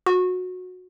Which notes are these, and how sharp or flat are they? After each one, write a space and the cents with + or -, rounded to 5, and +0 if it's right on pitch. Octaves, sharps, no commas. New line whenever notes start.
F#4 -20